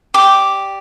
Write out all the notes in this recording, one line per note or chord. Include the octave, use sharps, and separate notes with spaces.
G4 D5 D6